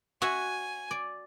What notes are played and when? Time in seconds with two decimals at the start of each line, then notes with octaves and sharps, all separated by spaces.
0.22 F#4 C#5 E5 G#5
0.91 D5